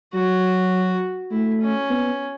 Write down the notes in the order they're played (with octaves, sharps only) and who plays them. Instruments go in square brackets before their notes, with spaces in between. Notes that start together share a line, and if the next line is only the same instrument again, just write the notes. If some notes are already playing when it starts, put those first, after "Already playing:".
[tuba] F#3 [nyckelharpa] F#4
[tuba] A3 [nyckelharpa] E4
[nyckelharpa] C#4
[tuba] B3